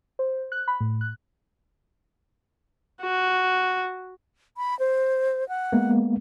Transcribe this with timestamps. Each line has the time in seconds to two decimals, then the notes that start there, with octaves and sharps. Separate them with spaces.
0.19 C5
0.52 F#6
0.68 B5
0.81 A2
1.01 F#6
3.02 F#4
4.57 B5
4.79 C5
5.49 F#5
5.72 G#3 A#3 B3